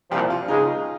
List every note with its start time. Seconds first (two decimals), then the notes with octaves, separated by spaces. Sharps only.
0.11 C2 A#2 F3 G4
0.30 F4
0.48 C#2 C#3 G#3 D#4